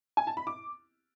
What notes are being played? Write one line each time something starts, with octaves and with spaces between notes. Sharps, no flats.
G#5
A5
B5
D6